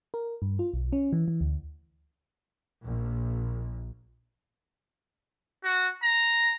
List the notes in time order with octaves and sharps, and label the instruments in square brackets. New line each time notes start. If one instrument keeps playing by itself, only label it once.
[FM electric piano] A#4
G2
F4
B1
C#4
E3
E3
D2
[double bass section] A#1
[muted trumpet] F#4
A#5